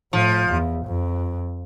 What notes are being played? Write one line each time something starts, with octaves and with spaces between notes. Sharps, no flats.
A2 F3
E2
F2